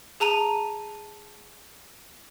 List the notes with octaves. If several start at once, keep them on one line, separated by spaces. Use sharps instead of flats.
G#4 A5 A#5 D#7 F7